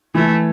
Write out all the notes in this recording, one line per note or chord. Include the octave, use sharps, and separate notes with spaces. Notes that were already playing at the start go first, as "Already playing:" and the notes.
E3 A3